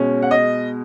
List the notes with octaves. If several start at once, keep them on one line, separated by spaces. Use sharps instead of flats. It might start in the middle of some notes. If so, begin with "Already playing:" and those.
Already playing: B2 G#3 C#4
F#5
D#5